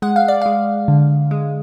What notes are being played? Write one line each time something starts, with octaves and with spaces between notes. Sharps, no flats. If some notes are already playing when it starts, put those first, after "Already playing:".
G#3 F#5
F5
D5
G#3 F5
D3
G#3